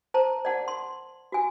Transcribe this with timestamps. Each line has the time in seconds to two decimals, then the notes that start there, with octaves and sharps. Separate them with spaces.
0.14 C5 A5 A#5
0.45 D5 F#5 A5
0.68 C6
1.32 F#4 G#5